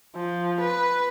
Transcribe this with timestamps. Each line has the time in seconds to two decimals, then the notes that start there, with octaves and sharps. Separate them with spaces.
0.16 F3
0.60 B4